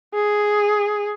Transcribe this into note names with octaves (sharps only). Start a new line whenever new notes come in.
G#4